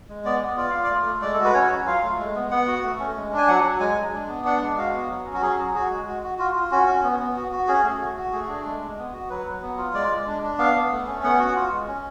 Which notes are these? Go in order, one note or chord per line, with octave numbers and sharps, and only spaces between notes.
G#3
B3 D5
B3
F4 D5
F4 F5
D5
A3
A3
G#3 D5
A4
F#4
B4
C#4 C#5
F#3
F4 F5
A3
G#3
B3
B3 F#5
F#4
A3
C#4
G#3
D4 G#5
F#3 F#5
F#3
G#3 G#5
G#3
D4
B3
D4 F#5
G#3
F#4 F5
B3
F#3
C#4
F#4
F#3 G#4
F#4
F#4 G#4
G#3
F#4
F#4
F4 F#4
F4
C#4 F#4
C#4
B3
B3
F#4
F#4
C#4 G#4
A3
F#4
F#4
A3 G#4
D4
G#3
G#3
B3
F#4
F#3 B4
F#3
B3
F4
G#3 D5
G#3
D4
D4
B3 F5
B3
A3
C#4
B3 F#5
F#4
F4
G#3
C#4